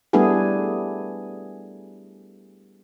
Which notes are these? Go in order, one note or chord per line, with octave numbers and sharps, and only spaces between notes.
G3 A3 B3 D4 E4 G#4